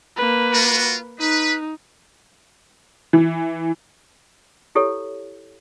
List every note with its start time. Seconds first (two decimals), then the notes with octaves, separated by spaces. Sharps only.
0.17 A#3 B4
0.53 F4 F#4
1.19 D#4 B4
3.13 E3
4.75 E4 G4 A4 C#5